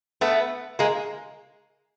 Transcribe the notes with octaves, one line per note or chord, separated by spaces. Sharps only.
A3 B3
G#3 A#3